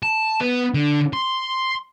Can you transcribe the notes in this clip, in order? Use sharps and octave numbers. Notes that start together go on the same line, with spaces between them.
A5
B3
D3
C6